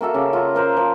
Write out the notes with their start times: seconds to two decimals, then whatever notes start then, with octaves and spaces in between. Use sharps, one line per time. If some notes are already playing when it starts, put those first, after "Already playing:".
0.01 A#3 F#4 A4 E5
0.14 C#3 D6
0.33 F4 A#5
0.55 A#3 A#4 C5
0.77 F3